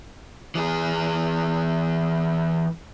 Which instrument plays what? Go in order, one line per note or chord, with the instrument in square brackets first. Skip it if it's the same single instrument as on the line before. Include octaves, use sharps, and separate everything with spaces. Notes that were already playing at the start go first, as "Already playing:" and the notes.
[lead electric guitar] E3 G#4